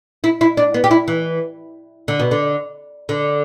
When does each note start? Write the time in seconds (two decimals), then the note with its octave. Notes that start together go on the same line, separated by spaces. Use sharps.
0.24 E4
0.41 E4
0.57 D4
0.74 B3
0.84 G4
0.91 E4
1.08 E3
2.08 D3
2.19 B2
2.31 D3
3.09 D3